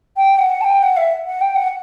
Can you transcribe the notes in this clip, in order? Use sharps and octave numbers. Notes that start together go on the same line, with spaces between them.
G5
F#5
A5
G5
F#5
E5
F#5
G5
F#5